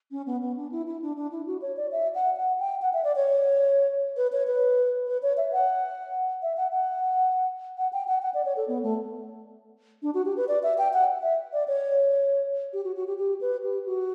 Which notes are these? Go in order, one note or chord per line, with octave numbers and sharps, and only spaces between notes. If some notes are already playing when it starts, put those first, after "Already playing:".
C#4
B3
B3
D4
E4
E4
D4
D4
E4
F#4
C#5
D5
E5
F#5
F#5
G5
F#5
E5
D5
C#5
B4
C#5
B4
B4
C#5
E5
F#5
E5
F#5
F#5
F#5
G5
F#5
F#5
D5
C#5
A4
B3
A3
D4
F#4
G4
B4
D5
E5
G5
F#5
E5
D5
C#5
G4
F#4
F#4
G4
G4
B4
G4
F#4